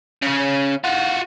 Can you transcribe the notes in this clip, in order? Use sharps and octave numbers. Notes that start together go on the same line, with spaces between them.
C#3 C#4
F4 F#4